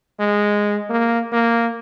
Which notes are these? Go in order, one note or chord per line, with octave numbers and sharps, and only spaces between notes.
G#3
A#3
A#3